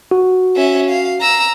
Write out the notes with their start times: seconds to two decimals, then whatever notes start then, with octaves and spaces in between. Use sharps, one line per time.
0.11 F#4
0.56 C#4 E5
0.90 F5
1.21 A#5 E6